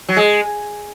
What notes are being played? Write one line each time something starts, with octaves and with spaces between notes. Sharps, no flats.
F#3
G#3